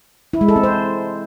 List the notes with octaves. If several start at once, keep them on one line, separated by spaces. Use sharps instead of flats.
E4
G#3
A4
C4
C5